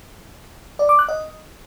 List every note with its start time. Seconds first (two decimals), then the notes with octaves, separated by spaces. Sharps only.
0.79 D5
0.89 D6
0.99 F#6
1.09 D#5